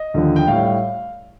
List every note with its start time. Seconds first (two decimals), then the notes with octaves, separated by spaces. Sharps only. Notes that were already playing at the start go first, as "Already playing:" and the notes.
Already playing: D#5
0.14 D#2 D3 F3
0.36 G5
0.47 A2 F5
0.52 G3